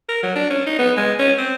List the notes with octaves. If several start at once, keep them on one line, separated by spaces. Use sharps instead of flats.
A#4
F#3
D4
C#4
D#4
B3
G#3
C#4
C4